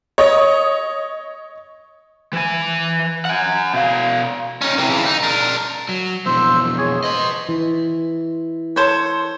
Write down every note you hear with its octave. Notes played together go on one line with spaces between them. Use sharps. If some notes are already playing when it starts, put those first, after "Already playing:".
C#5 D#5
E3 G#5
F#5 G#5
B2 F5
C#4 D#4
C3 E3
C#3 E3
D#4
D4 A#4
F#3
F2 B2 E3 C5 E6
G#4 C#5
B4 C5 D#5
E3
A4 C5 C#5